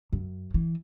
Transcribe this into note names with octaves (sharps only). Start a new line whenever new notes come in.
F#2
E3